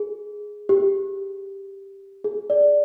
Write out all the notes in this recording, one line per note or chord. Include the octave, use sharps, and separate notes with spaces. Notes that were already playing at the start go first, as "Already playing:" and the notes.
Already playing: G#4
G4
G#4
D5